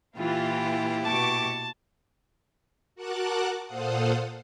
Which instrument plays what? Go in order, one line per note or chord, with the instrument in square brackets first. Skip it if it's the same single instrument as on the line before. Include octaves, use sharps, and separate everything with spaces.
[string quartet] A#2 E4 G4 [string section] E3 F4
[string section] B2 C#6 D6 [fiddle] A5
[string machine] F#4 A#4 F#5 A5 D6 F#6
A#2 A4 C5 F5 F#5 D#6